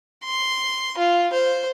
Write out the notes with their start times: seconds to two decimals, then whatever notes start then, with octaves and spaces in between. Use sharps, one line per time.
0.24 C6
0.98 F4
1.33 C5